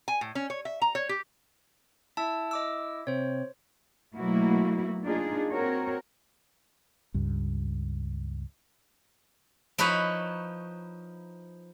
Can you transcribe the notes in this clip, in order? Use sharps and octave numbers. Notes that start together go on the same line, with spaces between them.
G#5
A2
C#4
C#5
E5
A#5
C#5
G4
E4 A5 E6
D#5 D6 E6
C3 C5 C#5
B2 F#3 A3 A#3 E4 F#4
A#3 D4 D#4 F4 G#4
C4 F#4 A#4 C#5
C#2 G2
F3 D#4 E4 B4 C#5